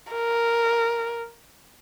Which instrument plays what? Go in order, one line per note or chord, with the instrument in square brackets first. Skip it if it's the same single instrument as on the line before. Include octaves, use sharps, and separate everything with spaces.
[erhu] A#4